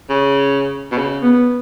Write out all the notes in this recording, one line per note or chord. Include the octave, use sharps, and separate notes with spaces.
C#3
B2
C#3
B3